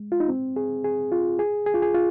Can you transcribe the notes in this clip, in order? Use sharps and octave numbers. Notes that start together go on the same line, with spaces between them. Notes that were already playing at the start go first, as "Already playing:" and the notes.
Already playing: G#3
F4
D#4
C4
G#4
G#4
F4
G#4
G#4
F4
G#4
F4